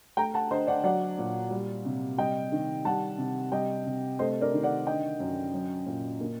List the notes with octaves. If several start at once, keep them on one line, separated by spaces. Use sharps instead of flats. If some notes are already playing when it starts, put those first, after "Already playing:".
A3 G5 A#5
F#5 A5
D3 C5 D#5
D5 F#5
F#3 D5 F#5
A#2
G3
C3
G3 D#5 G5
D#3
G3 F#5 A5
C3
G3 D#5 G5
C3
A3 C5 D#5
A#4 D5
D#3
D5 F#5
D3 D#5 G5
F#2
F#3
A#2
A#3